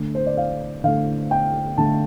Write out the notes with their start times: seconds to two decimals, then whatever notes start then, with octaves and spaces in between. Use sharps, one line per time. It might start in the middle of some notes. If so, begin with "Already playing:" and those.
Already playing: D3 A3
0.15 C5
0.27 D5
0.37 F5
0.84 D3 A3 F5
1.31 G5
1.78 D3 A3 A5